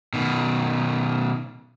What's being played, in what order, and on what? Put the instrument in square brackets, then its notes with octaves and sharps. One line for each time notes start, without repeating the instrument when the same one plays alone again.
[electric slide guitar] B2 D#3